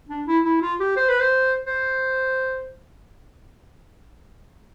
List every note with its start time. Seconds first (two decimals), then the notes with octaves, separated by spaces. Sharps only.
0.09 D4
0.26 E4
0.45 E4
0.61 F4
0.80 G4
0.96 C5
1.08 B4
1.20 C5
1.66 C5